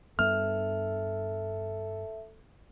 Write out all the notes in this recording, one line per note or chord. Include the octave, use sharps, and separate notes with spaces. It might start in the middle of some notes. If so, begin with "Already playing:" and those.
G2 B3 A4 E5 F6